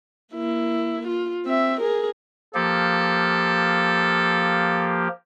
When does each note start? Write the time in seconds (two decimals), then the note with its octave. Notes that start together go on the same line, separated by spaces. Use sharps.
0.34 A#3 E4
1.08 F4
1.46 C4 E5
1.81 G#4 A#4
2.55 F3 A#3 G4 A4